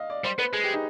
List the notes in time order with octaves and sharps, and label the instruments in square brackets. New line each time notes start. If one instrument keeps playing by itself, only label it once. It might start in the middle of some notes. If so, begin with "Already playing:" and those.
Already playing: [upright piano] D#5 F5
D5
[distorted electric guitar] G3 [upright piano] C5
[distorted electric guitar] B3 [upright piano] B4
[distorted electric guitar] G#3 [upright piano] G#4
[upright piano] G4
D#4